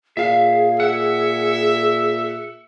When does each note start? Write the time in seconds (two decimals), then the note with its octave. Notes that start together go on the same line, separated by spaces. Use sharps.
0.17 A#2 G#4 E5 F5
0.80 E5 F#5